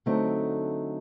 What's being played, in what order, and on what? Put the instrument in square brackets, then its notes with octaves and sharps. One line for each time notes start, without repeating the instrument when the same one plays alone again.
[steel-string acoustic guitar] D3 F#3 A3 C4 D#4